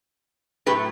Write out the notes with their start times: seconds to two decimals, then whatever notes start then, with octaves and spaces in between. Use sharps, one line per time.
0.66 A2 F#3 A3 G4 B4